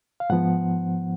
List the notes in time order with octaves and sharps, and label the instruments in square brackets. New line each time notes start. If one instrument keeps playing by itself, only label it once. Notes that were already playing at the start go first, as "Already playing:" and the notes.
[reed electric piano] F5
G#2 F3 B3 F#5